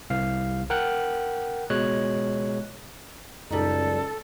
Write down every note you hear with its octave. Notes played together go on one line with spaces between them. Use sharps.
C2 F5
A#4 F#5 G5 F#6
B2 G#3 C#5 F#6
C#2 F#2 G3 D#4 A4